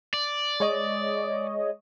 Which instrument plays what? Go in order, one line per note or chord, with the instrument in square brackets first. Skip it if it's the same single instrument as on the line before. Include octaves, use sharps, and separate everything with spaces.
[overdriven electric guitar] D5
[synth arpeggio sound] G#3 C#5 D#5